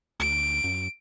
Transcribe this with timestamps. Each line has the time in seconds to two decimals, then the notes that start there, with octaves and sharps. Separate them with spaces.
0.20 D2 D7
0.64 F#2